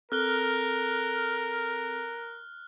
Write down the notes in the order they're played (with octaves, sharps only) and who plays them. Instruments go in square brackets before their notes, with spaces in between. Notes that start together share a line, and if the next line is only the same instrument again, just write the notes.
[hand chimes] C4 A4 [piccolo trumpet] A#4 [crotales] F6 F#6 G7